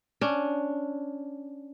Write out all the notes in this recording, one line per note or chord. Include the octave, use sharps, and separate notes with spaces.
C#4 D4